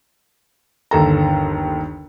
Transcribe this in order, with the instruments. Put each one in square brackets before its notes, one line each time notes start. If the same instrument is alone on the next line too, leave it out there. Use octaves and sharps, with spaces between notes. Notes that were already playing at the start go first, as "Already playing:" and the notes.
[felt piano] G1 D#2 A4 A#5